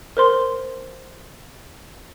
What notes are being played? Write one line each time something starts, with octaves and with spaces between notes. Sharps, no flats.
A#4 C5 C6